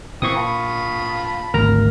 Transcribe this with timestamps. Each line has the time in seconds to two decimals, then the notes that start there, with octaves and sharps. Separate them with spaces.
0.22 A#2 E3 C4 C#6 D#6
0.36 F4 A5 B5
1.54 G#1 D2 A#4 A#5